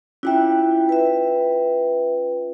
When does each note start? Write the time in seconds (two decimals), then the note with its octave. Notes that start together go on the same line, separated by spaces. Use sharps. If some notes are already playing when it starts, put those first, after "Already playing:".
0.23 C#4 E4 F4 E5 G5
0.89 B4 E5